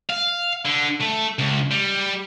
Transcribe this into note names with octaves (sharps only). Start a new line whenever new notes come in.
F5
D3
A3
C#2
G3